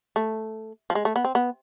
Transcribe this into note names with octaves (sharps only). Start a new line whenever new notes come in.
A3
F3
G#3
A3
B3
C4
B3